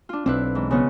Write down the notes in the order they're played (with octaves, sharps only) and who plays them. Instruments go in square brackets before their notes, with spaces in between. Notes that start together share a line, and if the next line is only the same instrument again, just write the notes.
[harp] D4 F4
[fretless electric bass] B1 C4 [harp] D4 E4 B4
[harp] G#2 E3
C#3 B3 F4